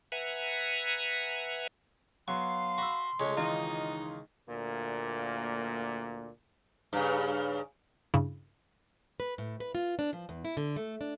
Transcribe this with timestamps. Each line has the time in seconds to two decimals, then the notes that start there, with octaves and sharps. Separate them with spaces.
0.12 B4 E5 F#5 G#5 A#5
2.28 F#3 B3 F5 C6 C#6
2.78 F#4 B5 E6
3.20 C#2 G#3 A3 C#4
3.37 D#3 E3 D#4 F4
4.48 D2 A#2 A#3
6.93 G2 C#3
8.14 G2 C#3 E4
9.20 B4
9.38 A2
9.60 B4
9.75 F4
9.99 D4
10.13 F3
10.29 E2
10.45 E4
10.57 D3
10.76 A3
11.01 D4